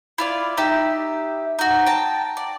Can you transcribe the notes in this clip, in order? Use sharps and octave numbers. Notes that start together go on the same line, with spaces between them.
E4 F4 D5
D#4 G4 E5
D#4 F#4
G5 A5 A#5
D5